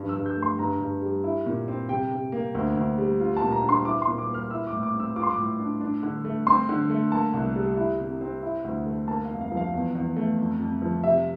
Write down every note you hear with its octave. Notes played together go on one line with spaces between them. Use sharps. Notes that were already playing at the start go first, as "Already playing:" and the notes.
Already playing: G2 F3
E6
G2
G6
A3
C6
G2 A#5
G2
G3
E4
A#2
C4
C3 G5
C3
A#3
D2
D2
G3
F4
A5
A#2
A#5
D4
C6
E4 D6
C6
A#2
D6
A#3 F6
E4 E6
D6
A2
D6
C4
E6
F4 D6
C6
D6
A2
D4
D4
D3
A3
C4 C6
D3
A3
A#3 A5
C2
G3
E4
C3
C4
E4
D2
A3
A#3 A5
F5
F2
F5
F3
F5
E2
E2
A3
F2
F2
F3
C3 E5